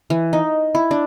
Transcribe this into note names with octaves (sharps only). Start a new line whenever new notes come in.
E3
D#4
E4
D4